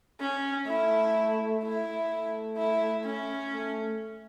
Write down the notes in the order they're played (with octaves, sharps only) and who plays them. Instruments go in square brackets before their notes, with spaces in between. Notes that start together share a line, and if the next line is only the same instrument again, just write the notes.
[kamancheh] C#4
[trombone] A3 [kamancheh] E4
[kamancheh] E4
[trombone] A3
[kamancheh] E4
C#4
[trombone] A3